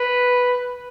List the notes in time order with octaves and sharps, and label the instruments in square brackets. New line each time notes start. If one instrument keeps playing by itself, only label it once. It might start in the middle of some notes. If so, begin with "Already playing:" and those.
Already playing: [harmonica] B4